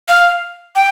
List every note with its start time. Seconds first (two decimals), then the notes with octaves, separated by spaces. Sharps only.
0.08 F5
0.76 G5